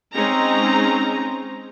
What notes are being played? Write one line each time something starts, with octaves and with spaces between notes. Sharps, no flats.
G#3 C4 C#4 D#4 A#5